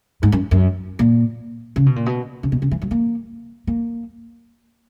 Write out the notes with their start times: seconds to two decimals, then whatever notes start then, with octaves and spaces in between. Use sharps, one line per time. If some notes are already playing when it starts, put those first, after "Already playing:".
0.23 G#2
0.32 F#2
0.51 F#2
0.99 A#2
1.76 C#3
1.86 B2
1.96 A#2
2.06 B2
2.43 C#3
2.52 B2
2.62 C#3
2.71 E3
2.82 F#3
2.91 A#3
3.67 A#3